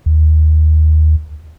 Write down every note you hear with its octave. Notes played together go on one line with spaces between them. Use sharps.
D#2